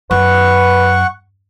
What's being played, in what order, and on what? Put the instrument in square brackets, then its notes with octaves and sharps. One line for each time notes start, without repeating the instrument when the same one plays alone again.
[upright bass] F#2 [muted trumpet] B4 [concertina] F#5 C#6